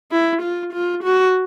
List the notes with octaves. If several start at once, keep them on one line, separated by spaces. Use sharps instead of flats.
E4
F4
F4
F#4